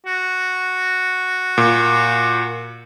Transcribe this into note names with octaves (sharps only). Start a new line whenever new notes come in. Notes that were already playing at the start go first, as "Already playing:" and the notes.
F#4
A#2